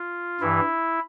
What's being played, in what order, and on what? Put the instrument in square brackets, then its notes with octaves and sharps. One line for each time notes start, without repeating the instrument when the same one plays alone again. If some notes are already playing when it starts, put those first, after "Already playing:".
Already playing: [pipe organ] F4
G2 E3 E4